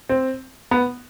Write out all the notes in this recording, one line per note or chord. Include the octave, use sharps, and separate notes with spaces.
C4
B3